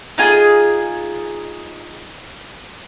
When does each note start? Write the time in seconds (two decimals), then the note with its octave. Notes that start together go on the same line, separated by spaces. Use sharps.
0.18 D#4 F4 G#4